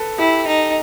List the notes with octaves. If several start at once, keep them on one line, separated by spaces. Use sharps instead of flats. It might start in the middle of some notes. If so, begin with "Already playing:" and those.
Already playing: A4 B4
E4 G4
D#4